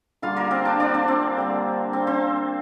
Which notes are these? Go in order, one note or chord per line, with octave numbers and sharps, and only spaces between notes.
D3 G3 A#3 F4 F5
A#3 A#4
C4 C5
D4 D5
D4 D5
C4 C5
C4 C5
D3 G3 A#3
C4 C5
C4 C5